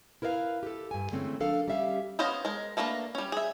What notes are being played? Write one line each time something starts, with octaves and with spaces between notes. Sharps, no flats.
E4 A#4 B4 D5 F5
G4 A4
G2 G#5
D3 E3 G#3 A3 C4 C#4
F3 D4 A4 A#4 F5
G3 C#4 G4 E5 F5
B3 C#4 C5 D#5 F5
G#3 A#4
A3 A#3 D4 A#4 B4
G3 C#4
G#4 E5